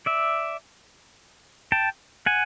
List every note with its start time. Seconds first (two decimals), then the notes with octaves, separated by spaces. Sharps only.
0.06 D5 E5
1.72 G5 A5
2.26 F#5 G#5